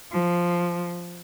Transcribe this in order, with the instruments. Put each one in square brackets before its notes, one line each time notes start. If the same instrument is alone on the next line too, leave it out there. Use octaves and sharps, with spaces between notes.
[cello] F3